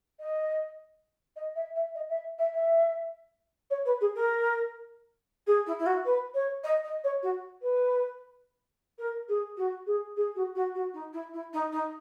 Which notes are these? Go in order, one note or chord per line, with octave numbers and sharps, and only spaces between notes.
D#5
D#5
E5
E5
D#5
E5
E5
E5
C#5
B4
G#4
A#4
G#4
E4
E4
F#4
B4
C#5
D#5
D#5
C#5
F#4
B4
A#4
G#4
F#4
G#4
G#4
F#4
F#4
F#4
D#4
E4
E4
D#4
D#4